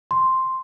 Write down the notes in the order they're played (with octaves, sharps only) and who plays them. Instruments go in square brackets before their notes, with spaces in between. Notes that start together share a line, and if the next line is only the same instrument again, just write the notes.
[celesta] C6